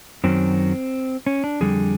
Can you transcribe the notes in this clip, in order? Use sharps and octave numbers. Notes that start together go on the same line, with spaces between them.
F#2 D#3 F#3 C4
C#4
D4
F2 D3 G3 G#4